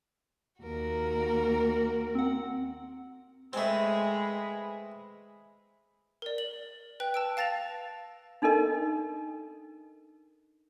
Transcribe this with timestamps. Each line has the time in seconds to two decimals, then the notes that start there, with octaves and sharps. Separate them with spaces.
0.62 D#2 F#4 A#4
2.15 C4 F#5
3.53 G#3 A3 C4 G#4 B4
6.22 A#4 D5
6.38 F#7
7.00 B4 G5 F#6
7.14 A5 E6 D7
7.37 F5 A5 A6 A#6 F7
8.42 D4 D#4 A4 A#4 D#5